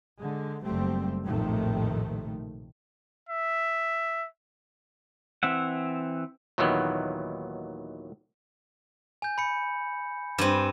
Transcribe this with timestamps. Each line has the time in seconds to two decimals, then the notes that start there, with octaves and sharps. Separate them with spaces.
0.19 D3 G#3
0.64 F#1 G3 A3 C4
1.26 A#1 F2 A2 C3 D#3 A3
3.29 E5
5.43 E3 C4 E5 F#5
6.58 D#2 A#2 D#3 E3 F#3 B3
9.22 G#5 G6
9.38 B5 C#7
10.38 G2 C4 D#7 E7